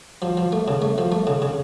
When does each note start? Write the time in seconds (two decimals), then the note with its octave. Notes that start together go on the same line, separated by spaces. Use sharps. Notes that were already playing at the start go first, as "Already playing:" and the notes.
0.22 F3
0.37 F3
0.52 A3
0.68 C#3
0.82 A3
0.98 F3
1.12 A3
1.27 C#3
1.42 C#3